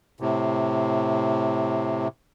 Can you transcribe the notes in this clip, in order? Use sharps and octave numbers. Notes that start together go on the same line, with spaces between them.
A2 C3